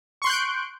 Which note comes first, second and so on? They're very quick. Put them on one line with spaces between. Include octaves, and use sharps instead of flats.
C#6 C6 F#6 G6 D7